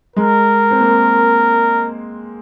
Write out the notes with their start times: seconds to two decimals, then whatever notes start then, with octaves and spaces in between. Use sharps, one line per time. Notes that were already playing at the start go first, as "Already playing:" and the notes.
0.16 G#3 A#4
0.71 C4
0.81 A#3